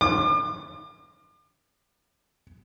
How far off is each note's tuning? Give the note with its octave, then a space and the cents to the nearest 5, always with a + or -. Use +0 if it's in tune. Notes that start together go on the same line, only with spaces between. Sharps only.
D6 +40